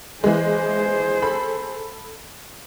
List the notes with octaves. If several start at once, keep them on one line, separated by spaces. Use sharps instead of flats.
E3 G#3 G#4 C5
A4 B5